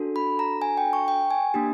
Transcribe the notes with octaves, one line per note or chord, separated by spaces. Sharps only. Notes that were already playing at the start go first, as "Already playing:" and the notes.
Already playing: D4 F#4 A4
B5
A#5
G#5
G5
C#6
G5
G#5
A#3 D4 G4